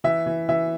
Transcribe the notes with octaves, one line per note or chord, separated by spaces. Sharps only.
E3 E5
E3
E3 E5